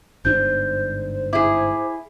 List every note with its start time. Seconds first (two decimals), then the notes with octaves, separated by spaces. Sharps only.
0.25 G1 G#2 D4 C5 G6
1.33 E4 G#4 D6